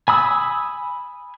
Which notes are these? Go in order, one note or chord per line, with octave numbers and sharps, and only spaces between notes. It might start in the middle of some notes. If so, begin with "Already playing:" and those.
G#5 B5 D#6 E6